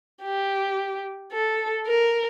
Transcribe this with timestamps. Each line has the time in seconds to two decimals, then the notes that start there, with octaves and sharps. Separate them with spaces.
0.23 G4
1.32 A4
1.87 A#4